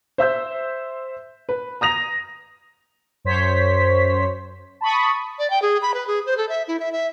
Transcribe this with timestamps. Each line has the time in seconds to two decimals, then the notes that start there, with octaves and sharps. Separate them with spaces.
0.18 C5 E5 E6 G6
1.49 B4
1.81 A#5 D#6 A#6 F7
3.25 F#2 C5 C#5 B6
4.81 A5 B5 C#6 D#6
5.39 D5
5.50 G5
5.62 G#4
5.82 B5
5.94 B4
6.07 G#4
6.26 C5
6.37 A4
6.49 E5
6.68 E4
6.80 E5
6.92 E5